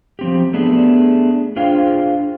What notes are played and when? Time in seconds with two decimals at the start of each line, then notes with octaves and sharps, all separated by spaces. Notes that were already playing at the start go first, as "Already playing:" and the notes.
0.19 F3 C4 G4
0.53 A3 B3 D4 G4 G#4
1.56 D4 F4 G#4 C5 F5 G5